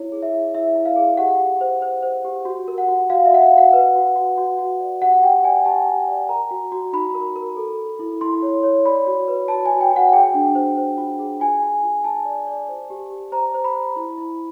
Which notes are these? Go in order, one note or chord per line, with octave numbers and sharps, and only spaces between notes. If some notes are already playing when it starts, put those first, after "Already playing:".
Already playing: E4 C#5
G#4
E5
E4
E4 E5
E4
F5
G#4
G4 F#5
G4
C5
C5
C5
G4
F#4
A#4
F#5
F#4
F#4 F5
E5
F#4 F#5
F5
F#4 F#5
B4
F#4
F#4
F#4
F#4
D5
G4 F#5
G4 G5
D5 G#5
G4 A5
G4
D5
A#4 A#5
F#4
F#4
D#4 B5
A#4
A#4
A4
A4
E4
E4 C6
C#5
C#5
D5 B5
F#4
B4
F#4 A5
F#4 G#5
G5
F#4 F#5
G#4 G5
D4
C5
C5
F4
G#4
F4 G#5
F4
F4
F4 A5
D5
D5
C5
G4
G4
C5 A#5
C5
B5
C5
E4
E4